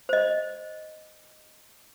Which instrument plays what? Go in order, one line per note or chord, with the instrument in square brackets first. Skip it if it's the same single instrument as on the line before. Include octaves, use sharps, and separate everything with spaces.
[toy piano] C5 D#5